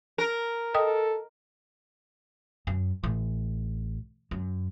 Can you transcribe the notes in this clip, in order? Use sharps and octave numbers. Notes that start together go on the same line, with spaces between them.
A#4
A4 D#5 G5 D#6
F#2
A1
F#2